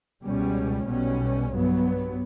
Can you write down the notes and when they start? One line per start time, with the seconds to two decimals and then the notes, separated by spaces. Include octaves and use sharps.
0.23 C#2 B2 G3 C#4
0.87 B1 B2 G3 C#4
1.51 G2 F#3 B3